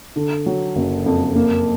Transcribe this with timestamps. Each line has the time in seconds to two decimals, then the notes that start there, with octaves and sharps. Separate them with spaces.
0.16 D3
0.46 F#3
0.76 F#1
1.06 F2
1.36 A#3